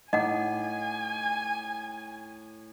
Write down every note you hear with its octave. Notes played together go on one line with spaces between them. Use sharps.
A2 D#4 D#5 F#5 G#5 D6